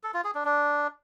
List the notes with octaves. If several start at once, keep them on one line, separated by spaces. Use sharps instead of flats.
A4
F4
G#4
D4
D4